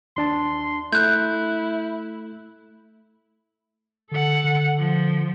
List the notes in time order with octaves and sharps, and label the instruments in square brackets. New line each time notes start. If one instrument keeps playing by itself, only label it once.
[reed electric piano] D#2 D4 A5 [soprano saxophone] C6
[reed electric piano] A3 [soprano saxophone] E4 [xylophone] F#6 G6
[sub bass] D3 [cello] A4 F#5
[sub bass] D3
[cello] F3